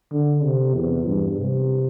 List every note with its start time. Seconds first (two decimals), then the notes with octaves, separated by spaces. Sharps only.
0.11 D3
0.43 C3
0.75 E2
1.08 G2
1.39 C3